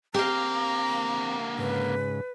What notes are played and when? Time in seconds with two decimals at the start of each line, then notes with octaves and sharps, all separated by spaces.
0.14 D3 A#3 C4 G4 F5 A#5
1.58 G#2 C#3 B4